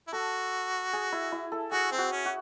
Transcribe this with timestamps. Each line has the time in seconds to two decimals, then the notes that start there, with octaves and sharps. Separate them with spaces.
0.07 E4
0.13 F#4 A4
0.93 G#4
1.12 E4
1.32 E4
1.52 A4
1.71 F#4 G#4
1.92 C4
1.98 F#4
2.12 C#4
2.25 F#4